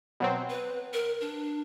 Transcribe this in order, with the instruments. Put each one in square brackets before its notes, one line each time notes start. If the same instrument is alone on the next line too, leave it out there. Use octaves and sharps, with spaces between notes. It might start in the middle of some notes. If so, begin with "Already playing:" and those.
[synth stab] B2 F#3 C4
[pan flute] B4
A#4
D4